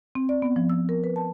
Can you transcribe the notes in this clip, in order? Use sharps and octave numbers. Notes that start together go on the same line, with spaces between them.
C4
D5
B3
F3
E6
A#4
B4
A5